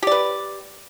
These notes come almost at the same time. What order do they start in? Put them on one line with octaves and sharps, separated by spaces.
G4 D5 B4